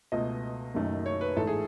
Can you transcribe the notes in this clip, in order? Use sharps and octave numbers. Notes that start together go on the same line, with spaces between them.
C#2 B2 A3 D#5
F#1 F#2 D#3 F#3 A3
C#5
B4
A1 G#2 E3 A3 A4
G#4